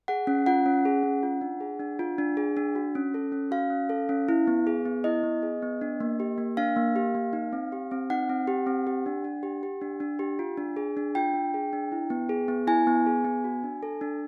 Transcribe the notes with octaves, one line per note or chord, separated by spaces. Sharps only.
G#4 F#5
C#4
F4 F#5
C#4
G#4
C#4
F4
D4
G#4
D4
F4
D4
G#4
D4
F#4
C#4
A4
C#4
F#4 F5
C#4
A4
C#4
E4
B3
G#4
B3
E4 D#5
B3
G#4
B3
D4
A#3
G4
A#3
D4 F5
A#3
G4
A#3
D#4
C4
G4
C4
D#4 F#5
C4
G4
C4
G4
D4
D4
G4
G4
D4
D4
G4
F4
D4
G#4
D4
F4 G5
D4
G#4
D4
E4
B3
G#4
B3
E4 G#5
B3
G#4
B3
F#4
D4
A4
D4